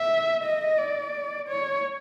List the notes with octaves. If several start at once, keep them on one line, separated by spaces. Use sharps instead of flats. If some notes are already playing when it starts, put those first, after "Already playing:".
Already playing: E5
D#5
D5
C#5